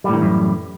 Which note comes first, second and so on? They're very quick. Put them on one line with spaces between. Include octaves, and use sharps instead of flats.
G3 A2 D#3 E3 F#2